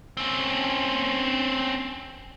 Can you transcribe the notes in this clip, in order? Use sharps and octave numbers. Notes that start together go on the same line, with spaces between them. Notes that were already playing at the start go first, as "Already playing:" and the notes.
C4 C#4